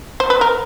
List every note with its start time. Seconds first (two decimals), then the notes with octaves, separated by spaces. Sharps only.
0.20 C5
0.30 B4
0.41 A#4